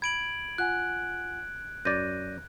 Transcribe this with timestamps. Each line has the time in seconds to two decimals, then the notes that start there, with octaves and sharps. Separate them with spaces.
0.02 B5 G#6 D7 F#7
0.58 F4 F#5 G#5 F#6
1.85 F#2 D5 G6 A#6 D#7